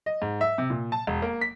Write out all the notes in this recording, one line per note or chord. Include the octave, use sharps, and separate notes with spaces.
D#5
G#2
E5
C3
A#2
A5
E1
A#3
B6